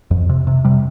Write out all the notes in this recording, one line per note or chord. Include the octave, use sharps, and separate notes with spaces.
F2
C3
C3
C3 G3